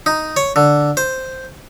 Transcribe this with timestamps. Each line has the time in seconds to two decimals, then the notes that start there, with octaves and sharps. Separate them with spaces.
0.06 D#4
0.37 C#5
0.56 D3
0.97 C5